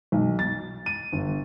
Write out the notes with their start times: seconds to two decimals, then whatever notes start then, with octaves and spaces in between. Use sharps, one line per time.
0.12 B1
0.39 A6
0.86 D#7
1.13 G1